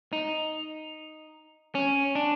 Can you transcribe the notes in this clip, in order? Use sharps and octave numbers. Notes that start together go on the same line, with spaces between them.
D#4
C#4
D4